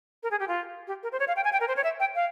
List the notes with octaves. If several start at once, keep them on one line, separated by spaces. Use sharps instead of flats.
A#4
G#4
G4
F4
G4
A#4
C5
C#5
F5
G5
G#5
G5
A#4
C5
C#5
E5
G5
F5